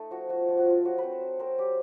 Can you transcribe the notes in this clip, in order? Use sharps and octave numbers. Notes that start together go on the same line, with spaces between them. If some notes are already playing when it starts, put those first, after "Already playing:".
Already playing: A3 D#4
F3 F#4
F3 F#4
F3
F#4
F3 F4
F#3 F#4
B4
C4
C5
F#3
C4 A#4
F#3 G4